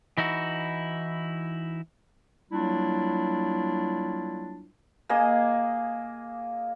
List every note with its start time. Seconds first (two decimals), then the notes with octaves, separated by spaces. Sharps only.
0.17 E3 D#4 E4 F#4
2.51 F#3 G3 A#3 D4 E4 F4
5.09 A#3 G#4 D#5